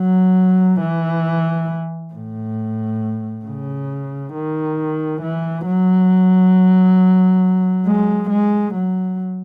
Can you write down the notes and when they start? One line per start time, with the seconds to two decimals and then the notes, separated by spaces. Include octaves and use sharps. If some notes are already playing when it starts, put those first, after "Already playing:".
Already playing: F#3
0.80 E3
2.13 A2
3.45 C#3
4.34 D#3
5.21 E3
5.66 F#3
7.85 G#3
8.29 G#3
8.74 F#3